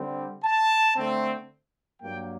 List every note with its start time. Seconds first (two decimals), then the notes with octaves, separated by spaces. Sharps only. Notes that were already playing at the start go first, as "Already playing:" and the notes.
Already playing: D3 G3 C4
0.44 A5
0.97 D3 A3 C4
2.02 G2 F#3 A#3 G5